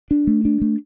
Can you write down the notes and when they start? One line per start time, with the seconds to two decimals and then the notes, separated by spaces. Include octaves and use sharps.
0.11 D4
0.27 A3
0.45 D4
0.61 A3